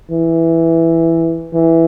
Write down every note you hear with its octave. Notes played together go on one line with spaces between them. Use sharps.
E3
E3